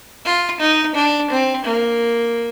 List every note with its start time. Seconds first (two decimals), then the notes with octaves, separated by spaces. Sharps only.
0.25 F4
0.60 D#4
0.95 D4
1.30 C4
1.64 A#3